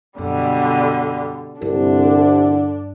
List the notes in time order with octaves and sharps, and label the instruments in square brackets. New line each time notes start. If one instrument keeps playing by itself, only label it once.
[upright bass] F#2 [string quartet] B2 D3 G3
[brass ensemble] C2 [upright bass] G2 [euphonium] D3 [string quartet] D4